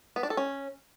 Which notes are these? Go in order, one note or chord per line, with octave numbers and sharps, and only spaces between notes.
B3
D4
A4
C#4